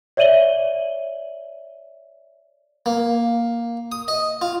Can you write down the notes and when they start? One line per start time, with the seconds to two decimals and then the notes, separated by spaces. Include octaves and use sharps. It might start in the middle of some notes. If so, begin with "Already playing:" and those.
0.17 C#5 D5 E5 D#7 F#7 G7
2.86 A#3
3.92 D#6
4.08 D#5
4.42 F4